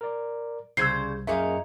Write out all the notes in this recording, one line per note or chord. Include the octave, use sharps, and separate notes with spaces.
A#4 D5
C2 C#3 G3 C5 E6 G#6 C7
F#2 A#2 D#4 G#4 E5 F5 C#7